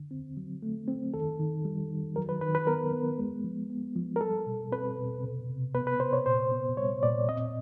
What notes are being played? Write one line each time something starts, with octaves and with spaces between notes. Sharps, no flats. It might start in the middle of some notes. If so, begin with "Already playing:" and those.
Already playing: D3
C4
F#3
A3
C4
D#3 A4
D#3
G3
D#3
F#3 A#4
B4
D#3 B4
B4
B3 A#4
B3
G#3
F3
B3
F3
A#4
G3 A4
B2
C4 B4
B2
C3
C3
B3 B4
B4
C3 C5
C#5
A#2 C5
B3
G3 C#5
A#2 D5
C4 D#5